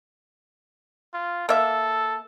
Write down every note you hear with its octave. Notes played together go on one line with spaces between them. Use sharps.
F4
A#3 A4 E5